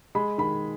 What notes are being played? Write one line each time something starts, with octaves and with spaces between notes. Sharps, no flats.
G#3 B5
D#3 B5